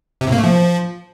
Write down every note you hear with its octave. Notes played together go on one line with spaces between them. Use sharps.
C3
A2
A#3
A3
F3